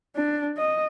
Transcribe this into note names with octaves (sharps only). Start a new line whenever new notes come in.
D4
D#5